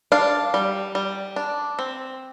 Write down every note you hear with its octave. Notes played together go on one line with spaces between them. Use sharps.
D4 F5
G3
G3
D4
C4